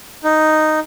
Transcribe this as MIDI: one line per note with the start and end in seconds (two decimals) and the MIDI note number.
0.24 0.80 63